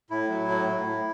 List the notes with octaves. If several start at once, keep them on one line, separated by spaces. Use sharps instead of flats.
A2 E4
F#3
A2
A2
A2